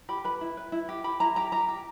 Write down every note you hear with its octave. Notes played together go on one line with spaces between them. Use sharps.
G4 B5
B4 B5
E4
B4
E4
G4
G4 B5
E4 A#5
G4 A#5
G4 A#5
G4